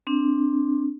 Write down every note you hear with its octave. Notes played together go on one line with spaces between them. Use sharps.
C4 D4